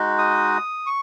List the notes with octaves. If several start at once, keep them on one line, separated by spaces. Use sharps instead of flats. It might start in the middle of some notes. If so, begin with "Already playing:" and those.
Already playing: G#3 D#4 F#4
D#6
C#6